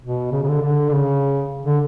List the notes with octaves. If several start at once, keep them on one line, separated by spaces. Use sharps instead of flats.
B2
C#3
C#3
D3
D3
C#3
D3